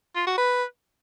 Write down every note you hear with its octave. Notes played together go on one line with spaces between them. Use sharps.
F4
F#4
B4